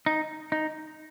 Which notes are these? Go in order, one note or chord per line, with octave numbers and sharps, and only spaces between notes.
D#4
D#4